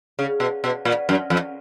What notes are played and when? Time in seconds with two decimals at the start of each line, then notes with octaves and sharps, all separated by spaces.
0.19 C#3
0.40 B2
0.64 B2
0.85 A#2
1.09 F#2
1.30 F2